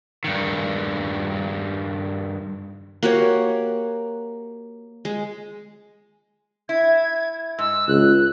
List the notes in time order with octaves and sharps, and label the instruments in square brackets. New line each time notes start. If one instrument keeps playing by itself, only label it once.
[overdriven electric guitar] G2 D#3
[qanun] A#3 F#4 G4 C#5
G#3
[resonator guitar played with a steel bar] E4 [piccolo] G#6
[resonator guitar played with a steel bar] G#2 [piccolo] E6
[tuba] C#2 [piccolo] F#6